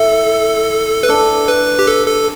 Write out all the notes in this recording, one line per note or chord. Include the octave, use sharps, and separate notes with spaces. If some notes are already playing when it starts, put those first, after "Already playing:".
Already playing: E4 A4
B4
D4 A4
B4
G4
A4
A4